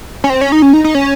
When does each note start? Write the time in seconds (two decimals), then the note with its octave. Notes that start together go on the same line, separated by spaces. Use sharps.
0.24 C#4
0.30 C4
0.41 C#4
0.52 D#4
0.62 C#4
0.73 D#4
0.84 D#4
0.95 C#4